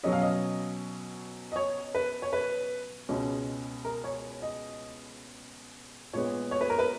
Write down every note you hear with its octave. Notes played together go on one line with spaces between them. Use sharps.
B2 F#3 C#4 D#5
F5
D#5
D#5
C#5
B4
C#5
B4
C#2 B2 G#3 C#4
A#4
C#5
D#5
A#2 G#3 B3 C#5
C#5
B4
A#4
B4